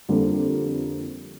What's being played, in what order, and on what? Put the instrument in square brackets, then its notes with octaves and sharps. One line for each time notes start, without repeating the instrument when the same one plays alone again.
[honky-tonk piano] F2 D3 G3 A#3